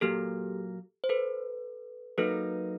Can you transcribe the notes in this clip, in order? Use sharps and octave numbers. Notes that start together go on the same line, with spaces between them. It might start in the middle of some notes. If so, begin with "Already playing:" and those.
A#2 F#3 A#3 G4 A4
C5
A4 B4
F#3 A#3 D#4 A4 B4